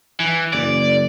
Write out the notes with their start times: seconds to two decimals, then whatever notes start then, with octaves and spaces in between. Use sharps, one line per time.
0.20 E3
0.53 F#1 D5